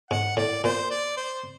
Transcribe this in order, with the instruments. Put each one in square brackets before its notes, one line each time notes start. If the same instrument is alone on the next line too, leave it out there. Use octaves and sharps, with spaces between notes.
[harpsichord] G#2 [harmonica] F#5
[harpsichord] A2 [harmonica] D5
[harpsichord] A#2 [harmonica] C5
[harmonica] D5
C5